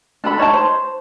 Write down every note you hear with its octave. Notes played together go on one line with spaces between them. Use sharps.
D4 A4 B5
D#4 C#5 E5 A5
C5